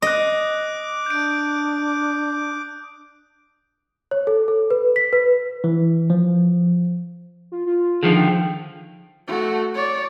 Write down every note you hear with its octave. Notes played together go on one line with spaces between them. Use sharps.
D#5 D6 D#6 F#6
D4 G6 D7
C#5
A4
A4
B4
B6
B4
E3
F3
F4
F4
D3 D#3 F3 G#4
G5
A3 F#4
C#5 D5